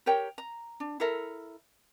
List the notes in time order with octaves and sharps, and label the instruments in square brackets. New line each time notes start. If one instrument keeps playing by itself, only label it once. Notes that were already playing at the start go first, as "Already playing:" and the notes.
[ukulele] G4 A#4 C#5 G5
A#5
D4
E4 A4 A#4 E5